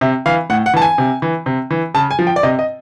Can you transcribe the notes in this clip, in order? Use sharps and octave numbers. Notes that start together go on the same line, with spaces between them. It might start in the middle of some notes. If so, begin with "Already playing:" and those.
C3 E5
E3 F5
A2 F#5
F#5
E3 A5
G#5
C3
E3
C3
E3
C#3 A5
G#5
F3
G5
D5
C3 D#5
D#5